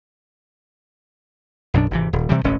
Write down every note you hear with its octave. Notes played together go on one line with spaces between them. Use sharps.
B1 F#2 B2 D4
G#1 C3 E3
D#1
C3 E3 G3
E1 A1 F#2 C#4